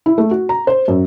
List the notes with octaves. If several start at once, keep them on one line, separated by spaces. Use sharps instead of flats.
E4
A3
F#4
A#5
C5
F#2